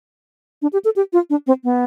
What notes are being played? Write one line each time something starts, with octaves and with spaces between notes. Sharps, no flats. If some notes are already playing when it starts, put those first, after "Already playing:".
D4
G4
A4
G4
F4
D4
C4
B3